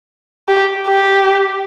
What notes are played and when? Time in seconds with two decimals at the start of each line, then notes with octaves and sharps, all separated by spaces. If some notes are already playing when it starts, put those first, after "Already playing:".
0.48 G4
0.87 G4